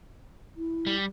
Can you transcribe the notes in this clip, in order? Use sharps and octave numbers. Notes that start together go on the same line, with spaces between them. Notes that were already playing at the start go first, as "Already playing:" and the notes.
E4
G3